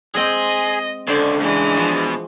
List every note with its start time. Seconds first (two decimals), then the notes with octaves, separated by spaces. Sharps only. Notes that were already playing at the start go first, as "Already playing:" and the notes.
0.15 G#3 C4 G#4 D#5 G5
1.08 C#2 D3 D4 C5 D5 B5
1.41 E3 G#3
1.77 B2 F3